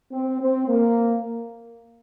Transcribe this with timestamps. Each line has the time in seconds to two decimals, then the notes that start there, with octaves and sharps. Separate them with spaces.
0.12 C4
0.40 C4
0.69 A#3